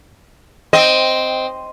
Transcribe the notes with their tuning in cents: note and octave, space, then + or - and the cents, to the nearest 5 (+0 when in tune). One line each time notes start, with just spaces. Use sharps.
C4 -5 D#5 +5